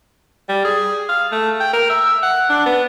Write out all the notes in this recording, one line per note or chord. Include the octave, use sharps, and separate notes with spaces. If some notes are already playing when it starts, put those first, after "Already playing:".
G3
G#4
F5
A3
G5
A#4
E5
F#5
D4
B3